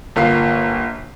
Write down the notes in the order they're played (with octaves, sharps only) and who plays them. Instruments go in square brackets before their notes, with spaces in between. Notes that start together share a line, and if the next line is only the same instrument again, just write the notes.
[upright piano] G1 A#3 F4 C7